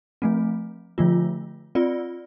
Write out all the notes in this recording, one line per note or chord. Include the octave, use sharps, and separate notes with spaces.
F3 A3 C4
D3 F3 A3 F4
C4 F4 D5